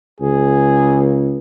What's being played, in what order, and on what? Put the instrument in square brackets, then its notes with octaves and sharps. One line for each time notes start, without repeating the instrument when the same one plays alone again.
[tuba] C#2 [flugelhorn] G#4